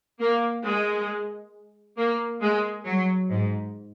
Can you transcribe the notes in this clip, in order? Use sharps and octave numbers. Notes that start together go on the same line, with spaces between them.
A#3
G#3
A#3
G#3
F#3
G#2